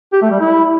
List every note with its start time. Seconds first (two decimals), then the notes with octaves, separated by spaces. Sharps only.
0.13 G4
0.22 A3
0.31 G3
0.41 E4